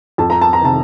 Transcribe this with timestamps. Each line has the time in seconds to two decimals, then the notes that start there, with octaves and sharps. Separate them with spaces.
0.18 F2 A5
0.30 A#5
0.42 A5
0.53 A#5
0.61 C3 D#3 A5